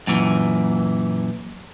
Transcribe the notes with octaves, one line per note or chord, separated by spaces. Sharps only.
F#2 A#2 E3